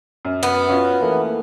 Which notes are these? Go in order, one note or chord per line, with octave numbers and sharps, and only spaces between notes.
F#2
B3
C#4 F4 F#4
E3 A3 A#3